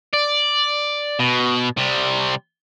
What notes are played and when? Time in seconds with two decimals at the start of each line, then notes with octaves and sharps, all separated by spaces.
0.13 D5
1.20 B2
1.77 C3 G3